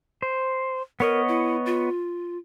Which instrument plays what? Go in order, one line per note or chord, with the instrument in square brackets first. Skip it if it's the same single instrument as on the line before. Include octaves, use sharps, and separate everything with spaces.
[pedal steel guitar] C5
[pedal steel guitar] B3 C#5 D#5 [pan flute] A#4
[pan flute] E4
F4